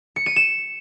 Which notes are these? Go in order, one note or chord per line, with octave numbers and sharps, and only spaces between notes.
C#7
D#7
E7